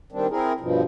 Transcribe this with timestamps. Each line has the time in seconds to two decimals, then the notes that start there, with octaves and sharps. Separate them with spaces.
0.12 D#3 G3 C4 D4
0.30 C4 E4 G#4 A#4
0.60 G2 B2 F3